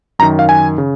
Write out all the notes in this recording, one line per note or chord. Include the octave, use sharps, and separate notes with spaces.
F#2 D#3 A#5
F5
G#5
C#3